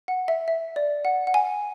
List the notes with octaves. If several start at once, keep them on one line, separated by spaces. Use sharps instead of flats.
F#5
E5
E5
D5
F#5
F#5
G#5